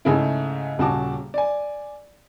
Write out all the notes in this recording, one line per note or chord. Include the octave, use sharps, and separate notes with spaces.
G#2 C#3 A3 E4
D#1 C#3 F#4 A5 D6
D5 G#5